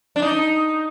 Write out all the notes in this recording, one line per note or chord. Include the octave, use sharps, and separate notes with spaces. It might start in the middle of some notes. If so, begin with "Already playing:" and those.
D4
D#4